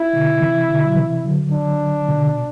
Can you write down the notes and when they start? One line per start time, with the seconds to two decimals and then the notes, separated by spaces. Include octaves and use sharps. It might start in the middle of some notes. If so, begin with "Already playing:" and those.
Already playing: E4
0.13 B2 D3
0.41 C3 E3
0.69 B2 D3
0.85 F#3
0.96 C3 E3
1.25 D3 F#3
1.52 D4
2.08 B2 D3
2.26 B2